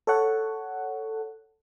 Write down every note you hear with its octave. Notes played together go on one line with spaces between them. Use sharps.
A4 C#5 F#5